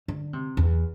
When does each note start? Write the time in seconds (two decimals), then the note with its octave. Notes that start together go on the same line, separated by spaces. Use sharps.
0.08 D3
0.33 C3
0.57 E2